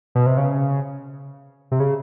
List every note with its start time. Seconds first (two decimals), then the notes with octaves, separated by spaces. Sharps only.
0.15 B2
0.26 C3
0.37 C#3
1.71 C3
1.80 C#3